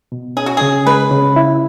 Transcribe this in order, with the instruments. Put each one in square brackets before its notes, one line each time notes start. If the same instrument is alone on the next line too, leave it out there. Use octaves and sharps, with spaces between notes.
[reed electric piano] B2
[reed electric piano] C#4 [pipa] G#4
[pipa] F#4
[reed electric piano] C#3 [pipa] G#4
[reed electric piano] G#3 [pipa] B4
[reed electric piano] C#3
E4